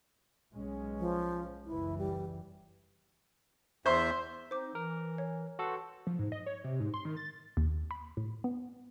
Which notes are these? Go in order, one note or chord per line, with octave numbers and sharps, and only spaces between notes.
B1 G#3 C#4
F3
F#1 C#2 E3 E4
G3
E2 C5 E5 C6
C4 D#4 C5 D6
E3 A#4
C#5
F#4 A4 B4 G5 C6
F3
G#2
D#5
C#5
C3
G#2
C6
D#3
A6
D#2
B5
A2
B3